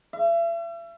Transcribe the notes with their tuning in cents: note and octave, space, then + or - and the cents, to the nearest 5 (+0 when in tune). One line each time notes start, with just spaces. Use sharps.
E5 +40